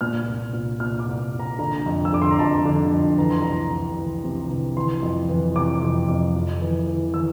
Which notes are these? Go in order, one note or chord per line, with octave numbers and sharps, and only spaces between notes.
A#2 F6
C2
A#2
A#2 F6
D6
C2
C2
A#5
D3 A#5
F2
E6
D3 D6
C6
A#5
F2 A5
D3
F2
E3 A#5
C6
C2 A#5
C2
E3
C3
E3
E3 C6
F2
E3
C3 D6
F2
F2
F2
E3
E3
E3 E6